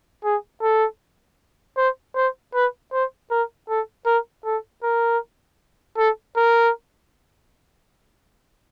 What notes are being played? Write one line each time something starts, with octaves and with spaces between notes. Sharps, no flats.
G#4
A4
C5
C5
B4
C5
A#4
A4
A#4
A4
A#4
A4
A#4